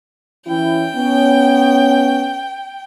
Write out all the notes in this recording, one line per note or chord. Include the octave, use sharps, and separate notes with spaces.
E3 C#4 E4 G5
B3 C#4